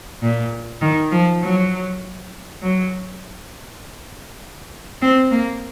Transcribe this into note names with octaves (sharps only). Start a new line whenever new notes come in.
A#2
D#3
F3
F#3
F#3
C4
A#3